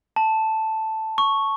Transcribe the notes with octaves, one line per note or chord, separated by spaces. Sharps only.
A5
C#6